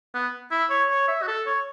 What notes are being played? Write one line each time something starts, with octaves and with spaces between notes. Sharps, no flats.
B3
E4
C#5
C#5
E5
F#4
A4
C#5